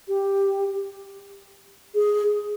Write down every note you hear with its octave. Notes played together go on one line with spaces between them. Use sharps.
G4
G#4